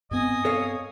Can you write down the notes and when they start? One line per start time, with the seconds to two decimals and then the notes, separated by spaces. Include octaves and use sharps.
0.11 G2 B3 C4 D#5 G#5 D#6
0.45 A4 C#5 F5